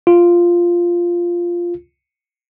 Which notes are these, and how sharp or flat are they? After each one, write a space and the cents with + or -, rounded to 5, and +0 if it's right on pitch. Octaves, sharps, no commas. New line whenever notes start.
F4 -5